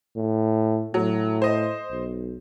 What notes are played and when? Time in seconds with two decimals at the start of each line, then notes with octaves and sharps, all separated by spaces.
0.16 A2
0.94 A2 F#3
1.42 C5 D#5
1.91 B1